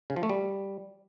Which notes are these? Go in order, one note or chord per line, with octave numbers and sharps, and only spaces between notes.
C#3
F3
A3
G3